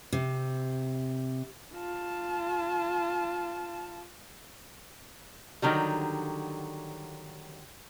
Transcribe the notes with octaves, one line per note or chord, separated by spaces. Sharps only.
C3
F4 A5
D3 D#3 F#3 G3